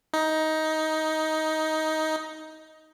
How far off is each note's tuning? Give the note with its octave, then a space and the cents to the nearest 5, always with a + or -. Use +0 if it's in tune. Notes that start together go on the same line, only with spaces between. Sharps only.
D#4 +15